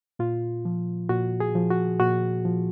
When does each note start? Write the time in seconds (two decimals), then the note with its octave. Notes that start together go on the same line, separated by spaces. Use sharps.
0.19 A#2 F4
0.65 F3
1.09 A#2 F#4
1.40 G#4
1.55 F3
1.70 F#4
2.00 A#2 F#4
2.45 F3